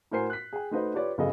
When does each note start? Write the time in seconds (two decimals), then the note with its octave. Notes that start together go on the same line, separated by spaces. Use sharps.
0.11 A2 F#4 A#4 C5 G#5 C7
0.30 F#6 B6
0.53 G#4 G5
0.71 A3 D#4 F#4 B4 C5 D#5
0.94 F4 G4 B4 C#5 D5
1.18 G1 C#3 F#3 G#4 A4 D#5